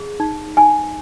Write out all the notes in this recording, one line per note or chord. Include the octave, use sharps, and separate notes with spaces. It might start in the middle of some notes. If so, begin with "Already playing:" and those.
Already playing: G#4
D#4
D#4 G#5